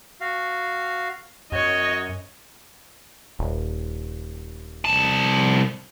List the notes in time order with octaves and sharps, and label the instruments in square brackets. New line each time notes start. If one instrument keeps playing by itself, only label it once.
[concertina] F#4 F5
[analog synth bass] F#2 [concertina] F#4 [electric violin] C#5 D#5
[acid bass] D#1
[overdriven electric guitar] C2 A5